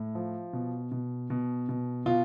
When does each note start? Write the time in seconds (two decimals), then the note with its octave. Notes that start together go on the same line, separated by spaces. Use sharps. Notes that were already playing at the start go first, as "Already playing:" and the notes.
Already playing: A2
0.15 F3
0.53 B2
0.92 B2
1.30 B2
1.69 B2
2.06 B2 F4